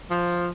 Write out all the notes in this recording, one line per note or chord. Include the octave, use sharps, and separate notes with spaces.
F3